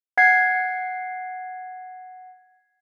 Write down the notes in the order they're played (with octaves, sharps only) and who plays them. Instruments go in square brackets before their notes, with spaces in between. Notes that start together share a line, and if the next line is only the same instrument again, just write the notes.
[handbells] F#5 G#6 C7